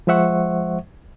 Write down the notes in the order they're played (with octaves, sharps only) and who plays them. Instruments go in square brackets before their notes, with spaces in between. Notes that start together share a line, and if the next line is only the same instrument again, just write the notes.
[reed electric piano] F3 G#3 C5 E5 F#5 C#6